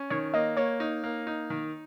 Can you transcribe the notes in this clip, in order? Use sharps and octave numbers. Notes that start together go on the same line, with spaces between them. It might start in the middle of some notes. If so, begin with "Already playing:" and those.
Already playing: C#4
D#3 C#5
A#3 D#5
A#3 C#5
D#4
A#3
D#4
D#3